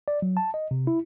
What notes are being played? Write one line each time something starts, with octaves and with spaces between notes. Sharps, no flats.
D5
F#3
A5
D#5
C3
E4